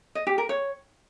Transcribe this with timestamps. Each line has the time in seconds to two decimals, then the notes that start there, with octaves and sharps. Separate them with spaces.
0.15 D#5
0.27 G4
0.38 A#4
0.49 C#5